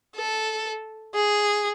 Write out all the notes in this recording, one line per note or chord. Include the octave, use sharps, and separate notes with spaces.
A4
G#4